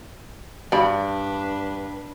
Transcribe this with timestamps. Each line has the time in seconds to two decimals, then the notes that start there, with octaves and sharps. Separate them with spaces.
0.72 G2 D4 B4 D5 B5